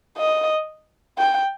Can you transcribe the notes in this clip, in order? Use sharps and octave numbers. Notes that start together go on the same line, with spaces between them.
D#5
G5